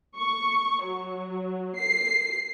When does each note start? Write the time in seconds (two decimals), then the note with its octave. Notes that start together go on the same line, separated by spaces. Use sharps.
0.18 C#6
0.84 F#3
1.77 C7